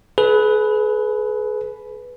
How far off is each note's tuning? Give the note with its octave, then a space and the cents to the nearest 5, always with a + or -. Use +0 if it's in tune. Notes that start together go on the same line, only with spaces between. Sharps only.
G#4 +40 B4 +0